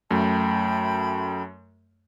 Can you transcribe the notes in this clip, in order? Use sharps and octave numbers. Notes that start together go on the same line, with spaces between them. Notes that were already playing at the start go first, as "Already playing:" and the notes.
F#2 A3 G5 A5 B5